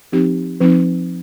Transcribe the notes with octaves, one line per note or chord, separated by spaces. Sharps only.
F3 C4 D#4 G4
F3 C4 D#4